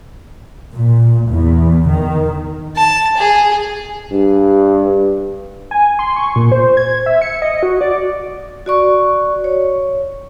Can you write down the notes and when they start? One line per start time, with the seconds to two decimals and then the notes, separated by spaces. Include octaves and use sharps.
0.72 A#2
1.30 E2
1.89 D#3
2.77 A5
3.17 G#4
4.12 G2
5.71 G#5
5.99 C6
6.16 C#6
6.36 A#2
6.52 C5
6.77 G#6
7.06 E5
7.22 C#7
7.42 D#5
7.63 F#4
7.81 D5
8.66 F#4 D5 C#6
9.44 C#5